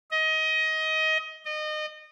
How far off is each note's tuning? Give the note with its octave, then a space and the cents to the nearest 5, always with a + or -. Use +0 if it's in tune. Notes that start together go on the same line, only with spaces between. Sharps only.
D#5 +20
D#5 -30